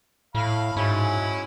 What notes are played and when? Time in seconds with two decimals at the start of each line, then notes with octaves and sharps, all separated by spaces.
0.35 A2 F5 B5
0.77 G#2 F#3 C#4 E4